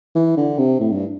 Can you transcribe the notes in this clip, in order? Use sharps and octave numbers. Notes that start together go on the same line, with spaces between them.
E3
D3
C3
A2
G2